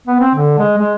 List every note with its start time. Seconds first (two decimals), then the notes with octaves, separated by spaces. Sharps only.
0.07 B3
0.20 C4
0.35 D3
0.58 G#3
0.77 G#3